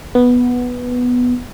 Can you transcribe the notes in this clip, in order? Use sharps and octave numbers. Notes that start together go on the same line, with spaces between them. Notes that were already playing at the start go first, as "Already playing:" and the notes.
B3